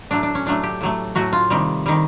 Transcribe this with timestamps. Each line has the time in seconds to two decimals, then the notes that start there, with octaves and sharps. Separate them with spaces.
0.11 A2 F#3 A3 D4
0.23 D4
0.35 C#4
0.46 A2 F#3 A3 D4
0.63 G4
0.81 A2 F#3 A3
1.15 A2 F#3 A3 F#4
1.33 F4
1.50 C3 D#3 G3
1.86 C3 D#3 G3